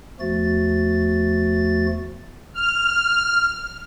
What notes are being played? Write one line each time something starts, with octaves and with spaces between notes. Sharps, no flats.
E2 F3 A3 F#4 A6
F6